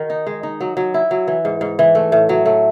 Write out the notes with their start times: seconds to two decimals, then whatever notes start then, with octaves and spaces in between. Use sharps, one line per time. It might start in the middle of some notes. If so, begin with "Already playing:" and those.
Already playing: D#3 F#4
0.10 D#4
0.27 G#3
0.43 D#4
0.61 F#3
0.77 F#3
0.94 E4
1.11 F#3
1.28 E3
1.45 G#2
1.61 G#2
1.79 E3
1.95 A3
2.12 A2
2.29 F#3
2.46 A3